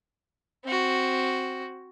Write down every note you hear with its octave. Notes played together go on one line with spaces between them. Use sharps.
C4 F#4